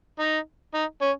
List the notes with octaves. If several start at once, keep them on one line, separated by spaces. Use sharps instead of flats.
D#4
D#4
C#4